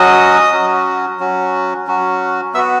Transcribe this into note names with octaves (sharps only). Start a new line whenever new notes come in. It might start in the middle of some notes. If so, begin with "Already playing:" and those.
Already playing: F#3 C#4 F#4 D#5 D#6
F#3 C#4 F#4
F#3 C#4 F#4
F#3 C#4 F#4
B3 F#4 E5 E6